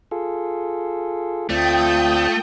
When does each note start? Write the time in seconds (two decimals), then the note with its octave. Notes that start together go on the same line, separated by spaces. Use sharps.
0.11 F4 G#4 A4
1.50 D2 A3 C4 F4 D5 G5 D#6 G6